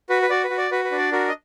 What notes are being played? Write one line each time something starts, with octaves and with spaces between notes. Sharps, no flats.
F#4 B4
B4
F#4 D5
B4
F#4
D5
F#4 B4
B4
D4
D5
F#4 A#4
D#5